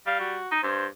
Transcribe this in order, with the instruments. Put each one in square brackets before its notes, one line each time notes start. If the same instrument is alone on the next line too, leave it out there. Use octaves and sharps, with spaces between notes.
[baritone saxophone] G3 [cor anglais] F5
[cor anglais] F#4
[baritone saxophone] D#4
[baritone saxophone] G2 [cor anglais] C5